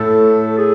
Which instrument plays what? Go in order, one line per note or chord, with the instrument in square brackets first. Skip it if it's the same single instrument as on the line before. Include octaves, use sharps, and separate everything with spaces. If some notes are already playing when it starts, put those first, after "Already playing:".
Already playing: [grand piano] A2 A3 [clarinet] A4
[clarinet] G#4